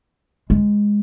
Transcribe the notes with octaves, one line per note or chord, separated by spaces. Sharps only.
G#3